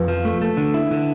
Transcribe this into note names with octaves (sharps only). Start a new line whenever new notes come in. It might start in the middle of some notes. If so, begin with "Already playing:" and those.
Already playing: F2 B4
F3
A3
A3
D3
E4
D3